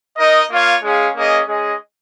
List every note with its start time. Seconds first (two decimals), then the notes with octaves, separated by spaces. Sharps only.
0.17 D#4 A#4 D#5
0.49 A#3 F4 C#5 F5
0.83 G#3 C#4 G#4 F5
1.15 A#3 C#4 G#4 D#5
1.48 G#3 C#4 G#4 D#5